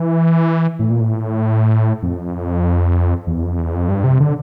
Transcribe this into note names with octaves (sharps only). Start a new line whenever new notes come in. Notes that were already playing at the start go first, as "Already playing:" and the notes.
Already playing: E3
A2
A#2
A2
F2
E2
F2
E2
F2
G2
C3
D3